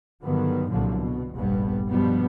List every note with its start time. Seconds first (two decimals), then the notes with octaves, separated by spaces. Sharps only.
0.23 G2 D3 D#3 F#3 B3
0.69 C2 G2 A#2 D3 F3 F#3
0.98 B2
1.36 F1 A#1 G2 G3 B3
1.87 G2 B2 F3 G3 B3